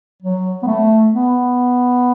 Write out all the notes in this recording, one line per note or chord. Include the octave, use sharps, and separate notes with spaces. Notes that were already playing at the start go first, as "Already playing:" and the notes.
F#3
B3
A3
B3